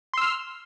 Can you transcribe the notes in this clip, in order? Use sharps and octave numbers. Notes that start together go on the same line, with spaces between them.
C6 E6 F6